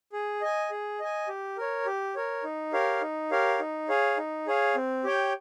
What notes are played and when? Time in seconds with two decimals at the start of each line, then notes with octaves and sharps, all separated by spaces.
0.13 G#4
0.41 D#5 G#5
0.71 G#4
1.00 D#5 G#5
1.28 G4
1.57 A#4 C#5
1.86 G4
2.15 A#4 C#5
2.44 D#4
2.73 G4 A#4 C#5 F5
3.02 D#4
3.31 G4 A#4 C#5 F5
3.60 D#4
3.89 G#4 C#5 F5
4.18 D#4
4.47 G#4 C#5 F5
4.75 C4
5.04 G4 C#5 G5